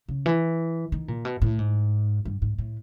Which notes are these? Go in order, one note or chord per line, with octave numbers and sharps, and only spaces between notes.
C#3
E3
D#3
A#2
B2
A2
G#2
G2
G#2
A2